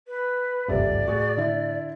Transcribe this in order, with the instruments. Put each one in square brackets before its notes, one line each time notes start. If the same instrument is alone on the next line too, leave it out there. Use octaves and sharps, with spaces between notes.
[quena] B4
[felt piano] D#1 C3 E5 [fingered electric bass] G#1 C#2 G2 [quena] D5
[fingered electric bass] A2 [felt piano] F#4 G#4
[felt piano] D3 E4